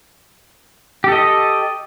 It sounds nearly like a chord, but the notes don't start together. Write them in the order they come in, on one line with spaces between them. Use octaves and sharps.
G4 A4 D#5